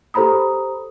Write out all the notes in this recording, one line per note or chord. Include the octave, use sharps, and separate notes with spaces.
G4 A4 C5 A#5 B5 D#6